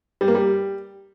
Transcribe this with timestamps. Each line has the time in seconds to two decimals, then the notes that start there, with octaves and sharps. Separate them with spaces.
0.21 G3
0.28 A#3
0.35 G3